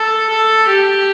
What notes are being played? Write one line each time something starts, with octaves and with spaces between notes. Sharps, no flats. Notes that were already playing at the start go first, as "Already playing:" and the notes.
Already playing: A4
A4
G4